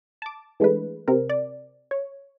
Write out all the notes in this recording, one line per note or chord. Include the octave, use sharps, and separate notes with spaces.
A5 D6
E3 G#3 A3 D4 B4
C3 C4 A#4
D5
C#5